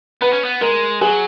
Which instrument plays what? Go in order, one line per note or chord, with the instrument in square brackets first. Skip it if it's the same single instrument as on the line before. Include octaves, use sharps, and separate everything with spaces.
[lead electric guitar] B3 [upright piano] B4
[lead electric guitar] C#4
B3
[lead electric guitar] G#3 [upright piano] A#4
[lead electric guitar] F#3 [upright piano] G#4